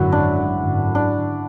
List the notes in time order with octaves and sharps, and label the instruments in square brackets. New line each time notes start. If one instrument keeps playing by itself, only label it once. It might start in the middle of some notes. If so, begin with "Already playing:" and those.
Already playing: [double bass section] G#1 F#2 D3 F#3 [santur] E4 F#4
[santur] D4
[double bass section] G#1 F#2 D3
[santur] D4